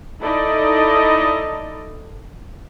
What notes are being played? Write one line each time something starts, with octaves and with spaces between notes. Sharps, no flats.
D#4 E4 A4 D5 D#5